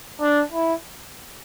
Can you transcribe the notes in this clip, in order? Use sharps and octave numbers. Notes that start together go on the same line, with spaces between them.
D4
E4